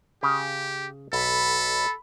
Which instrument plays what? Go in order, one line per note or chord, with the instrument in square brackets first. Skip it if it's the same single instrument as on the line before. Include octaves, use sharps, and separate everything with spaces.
[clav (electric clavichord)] C#3 [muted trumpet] G4
[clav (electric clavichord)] B1 [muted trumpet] A4 [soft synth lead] B5